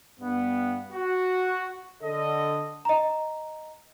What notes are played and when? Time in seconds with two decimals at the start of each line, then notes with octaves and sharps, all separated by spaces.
0.20 G2 B3
0.92 F#4
2.02 D3 A4 D#5
2.85 D#5 A#5